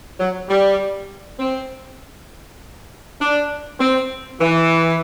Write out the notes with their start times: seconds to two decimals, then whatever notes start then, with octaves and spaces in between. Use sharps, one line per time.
0.19 F#3
0.49 G3
1.39 C4
3.20 D4
3.79 C4
4.40 E3